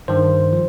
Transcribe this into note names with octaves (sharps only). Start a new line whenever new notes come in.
G2 D#3 C5
F3